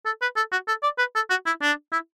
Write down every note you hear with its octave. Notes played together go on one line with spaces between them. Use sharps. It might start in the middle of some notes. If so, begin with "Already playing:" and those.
A4
B4
A4
F#4
A4
D5
B4
A4
F#4
E4
D4
E4